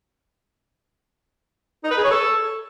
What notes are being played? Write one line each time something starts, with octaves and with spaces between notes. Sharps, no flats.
D#4
B4
G#4
C#5
A4